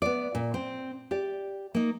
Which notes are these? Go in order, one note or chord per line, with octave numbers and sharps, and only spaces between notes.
B3 D5
A#2
C4
G4 D5
A#3 D#4